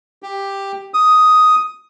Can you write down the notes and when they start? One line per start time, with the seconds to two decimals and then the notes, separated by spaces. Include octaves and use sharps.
0.23 G4
0.94 D#6